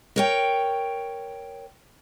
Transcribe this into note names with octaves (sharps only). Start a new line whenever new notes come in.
A#4 C#5 G5